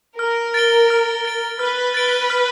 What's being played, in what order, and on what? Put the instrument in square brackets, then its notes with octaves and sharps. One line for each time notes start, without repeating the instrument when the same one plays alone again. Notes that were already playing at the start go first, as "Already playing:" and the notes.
[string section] A#4 [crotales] F6
[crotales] A6 D7 G7
F6
A6 D7 G7
[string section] B4 [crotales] F6
[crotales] A6 D7 G7
F6